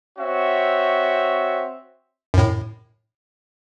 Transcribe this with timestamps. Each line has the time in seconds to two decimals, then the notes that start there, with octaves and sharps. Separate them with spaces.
0.18 C4 F#4 C#5 E5
2.34 F#2 A2